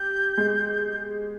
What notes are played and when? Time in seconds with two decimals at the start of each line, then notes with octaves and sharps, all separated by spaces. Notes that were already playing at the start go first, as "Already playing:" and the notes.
Already playing: G4 G6
0.38 G#3